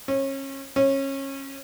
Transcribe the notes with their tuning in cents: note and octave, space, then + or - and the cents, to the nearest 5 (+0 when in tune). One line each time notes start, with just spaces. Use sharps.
C#4 -30
C#4 -25